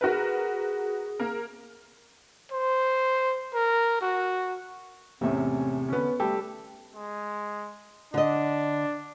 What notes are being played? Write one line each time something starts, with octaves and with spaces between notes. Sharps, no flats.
F#4 G#4 A#4 B4
A#3 A#4
C5
A#4
F#4
E2 A2 C3 C#4 E5
D3 B3 C#4
G3 A3 G4 A4
G#3
D3 D4 D#5